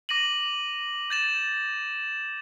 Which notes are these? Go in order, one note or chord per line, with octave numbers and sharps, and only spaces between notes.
D6 A#6 D#7 F#7
G6 A6 E7